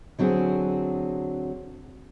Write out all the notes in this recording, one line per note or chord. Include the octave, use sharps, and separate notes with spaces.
D3 F#3 C4 F#4 G#4